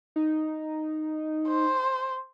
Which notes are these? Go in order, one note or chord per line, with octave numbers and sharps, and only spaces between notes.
D#4
C5